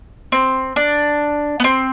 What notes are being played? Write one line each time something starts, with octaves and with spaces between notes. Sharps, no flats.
C4
D4
B3
C4